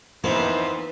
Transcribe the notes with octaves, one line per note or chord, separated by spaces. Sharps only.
F2 E3 A#3 B3 D#4 E4 B4 C5